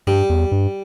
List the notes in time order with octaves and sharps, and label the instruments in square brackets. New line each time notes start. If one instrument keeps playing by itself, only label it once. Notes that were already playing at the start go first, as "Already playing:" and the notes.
[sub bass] G2 [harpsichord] G3
[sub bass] E2
G2